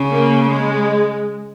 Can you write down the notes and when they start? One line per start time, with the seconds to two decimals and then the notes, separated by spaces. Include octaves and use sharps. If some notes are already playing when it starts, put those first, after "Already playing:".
Already playing: C#3
0.12 A#3
0.49 G#3